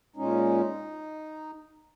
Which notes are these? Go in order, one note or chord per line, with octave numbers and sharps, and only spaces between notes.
A#2 G#3 C#4 D#4